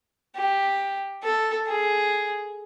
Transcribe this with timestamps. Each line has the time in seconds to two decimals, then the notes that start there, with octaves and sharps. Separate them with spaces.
0.36 G4
1.23 A4
1.67 G#4